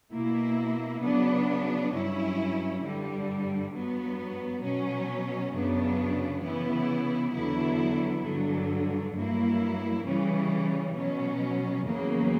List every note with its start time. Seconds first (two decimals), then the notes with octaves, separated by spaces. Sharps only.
0.11 B2 A#3 E4
1.02 C#3 F#3 B3 D4
1.93 G2 F#3 C#4 E4
2.82 G2 D3 G3
3.72 G2 F#3 B3
4.63 B2 F#3 C#4
5.53 F#2 C#3 F#3 B3 D4
6.43 C#3 E3 B3 E4
7.34 E2 D3 F#3 B3 E4
8.24 G2 D3 F#3
9.14 G2 F#3 A#3 E4
10.04 C#3 E3 G3 C#4
10.95 B2 F#3 C#4
11.85 E2 C#3 F#3 A#3